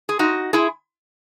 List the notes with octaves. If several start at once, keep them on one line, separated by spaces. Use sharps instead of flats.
G#4
D#4 F#4
E4 G#4